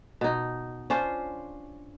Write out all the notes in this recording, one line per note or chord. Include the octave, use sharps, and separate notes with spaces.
B2 D#4
C#4 D4 F4 C5